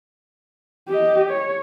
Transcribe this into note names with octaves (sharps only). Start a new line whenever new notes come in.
G4 D#5
C#5